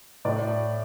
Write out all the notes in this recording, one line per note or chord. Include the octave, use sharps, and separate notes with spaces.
A2 D5